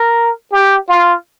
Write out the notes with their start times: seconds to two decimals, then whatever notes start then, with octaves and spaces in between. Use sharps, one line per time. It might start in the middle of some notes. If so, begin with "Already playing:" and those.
Already playing: A#4
0.52 G4
0.88 F4